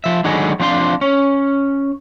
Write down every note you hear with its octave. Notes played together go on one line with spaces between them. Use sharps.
F3 E5
D3 D#3 F#3 G#3 B3 G#4
F3 C4 D4 F5 C6
C#4